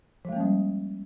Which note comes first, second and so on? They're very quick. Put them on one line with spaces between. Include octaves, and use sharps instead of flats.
F3 G#3 A#3 C#4 G3